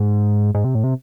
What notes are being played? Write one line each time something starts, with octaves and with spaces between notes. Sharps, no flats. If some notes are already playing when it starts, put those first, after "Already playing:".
Already playing: G#2
G#2
C3
A2
C3